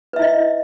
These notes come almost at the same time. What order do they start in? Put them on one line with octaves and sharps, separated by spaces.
B4 E5 E4 D#5